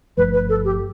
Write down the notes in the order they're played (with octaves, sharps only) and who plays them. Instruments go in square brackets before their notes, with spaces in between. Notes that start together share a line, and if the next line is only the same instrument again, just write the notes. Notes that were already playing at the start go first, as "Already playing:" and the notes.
[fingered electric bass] G1 G2 F3 A3 [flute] B4
[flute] B4
A4
G4